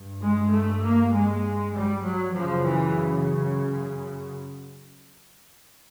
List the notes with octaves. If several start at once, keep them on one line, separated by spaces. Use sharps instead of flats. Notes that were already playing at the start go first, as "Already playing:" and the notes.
Already playing: G2
G#3
A3
A#3
G#3
G3
F#3
F#2 C#3 F3
E3